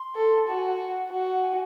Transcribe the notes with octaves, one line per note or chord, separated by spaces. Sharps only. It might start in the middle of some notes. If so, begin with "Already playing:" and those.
Already playing: C6
A4
F#4 A5
G#5
F#5
F#4
G#5